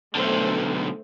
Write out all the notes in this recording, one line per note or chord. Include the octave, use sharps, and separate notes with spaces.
B1 D3 A3 C5